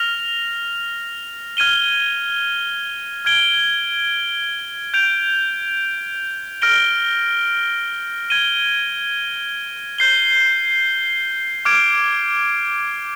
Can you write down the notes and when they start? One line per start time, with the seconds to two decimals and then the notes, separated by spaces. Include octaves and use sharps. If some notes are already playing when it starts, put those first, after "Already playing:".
Already playing: F6 A#6 F7
1.57 F6 G#6 D#7 G7
3.25 F6 G#6 D7 G7
4.94 G6 D7 F7
6.62 F6 A#6 D7 G7
8.30 G#6 D#7 G7
9.98 G6 C7 G7
11.65 D6 F6 G#6 D7